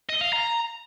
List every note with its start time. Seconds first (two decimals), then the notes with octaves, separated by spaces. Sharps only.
0.09 D#5
0.21 F5
0.33 A#5